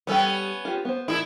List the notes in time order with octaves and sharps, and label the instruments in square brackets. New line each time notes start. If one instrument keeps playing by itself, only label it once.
[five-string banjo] G3 A4 G5 [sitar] B3 C#4
[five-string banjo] F4 G4
B3 C5
[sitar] A2 E4 [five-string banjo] G#4